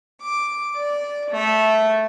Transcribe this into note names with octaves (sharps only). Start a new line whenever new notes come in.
D6
D5
A3